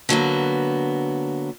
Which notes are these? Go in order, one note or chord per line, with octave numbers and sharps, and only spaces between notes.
D3 F#3 A#3 B3